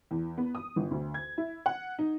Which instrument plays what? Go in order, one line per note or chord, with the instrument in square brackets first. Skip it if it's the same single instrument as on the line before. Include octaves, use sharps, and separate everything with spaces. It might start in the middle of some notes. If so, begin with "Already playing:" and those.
[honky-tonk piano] E2
B3
D#6
G1
D2
G#6
E4
F#5
D#4